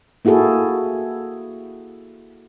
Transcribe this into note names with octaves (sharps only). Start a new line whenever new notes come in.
A#3 E4 F#4 G#4 A4